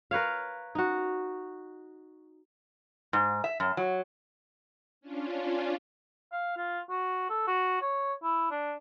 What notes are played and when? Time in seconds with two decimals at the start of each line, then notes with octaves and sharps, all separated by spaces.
0.11 A#4 B4 C#5 F5
0.75 D#4 F#4
3.13 G#2
3.44 E5
3.60 F#2
3.77 F#3
5.01 C#4 D4 F4
6.32 F5
6.57 F4
6.89 F#4
7.29 A4
7.47 F#4
7.82 C#5
8.23 E4
8.50 D4